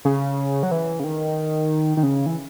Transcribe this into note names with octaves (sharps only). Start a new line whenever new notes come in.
C#3
F#3
E3
C#3
D#3
D#3
C#3
E3